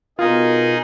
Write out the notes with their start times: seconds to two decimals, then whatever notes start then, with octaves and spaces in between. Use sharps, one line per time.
0.19 B2 D#4 F4 G#4 A#4